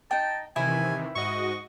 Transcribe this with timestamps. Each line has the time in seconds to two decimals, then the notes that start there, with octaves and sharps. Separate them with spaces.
0.11 D#4 G5 A5
0.56 C3 D#3 E3 E4 G#5
1.15 G#2 F#4 D#5 C#6